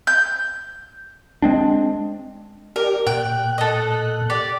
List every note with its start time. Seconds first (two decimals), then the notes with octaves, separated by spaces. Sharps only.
0.07 G6
1.42 G#3 C4 D4
2.76 G4 A#4 D5
3.07 A#2 G5 F#6
3.58 A4 D#5
4.30 G4 D5